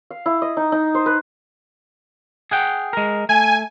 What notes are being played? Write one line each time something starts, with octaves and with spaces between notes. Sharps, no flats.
F5
E4
D#5
D#4
D#4
C5
B4
G#4 F#5 G5
G#3 A#4
A3 G#5